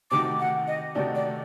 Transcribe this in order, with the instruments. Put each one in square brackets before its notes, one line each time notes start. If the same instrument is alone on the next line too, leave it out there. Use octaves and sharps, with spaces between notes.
[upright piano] C3 D#3 A3 D#4 F#4 [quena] D6
[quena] F#5
D#5
[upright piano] C3 D#3 A3 D#4 F#4 [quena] D5
[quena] D5